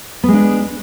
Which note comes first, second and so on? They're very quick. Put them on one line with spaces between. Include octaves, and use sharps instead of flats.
B3 G#3 D4